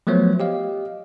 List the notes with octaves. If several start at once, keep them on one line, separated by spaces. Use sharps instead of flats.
F3 F#3 A3 B3 C5 C#5
G4 D#5 F5